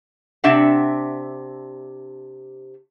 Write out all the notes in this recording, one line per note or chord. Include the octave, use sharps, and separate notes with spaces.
C3 C4 D4 E5 F#5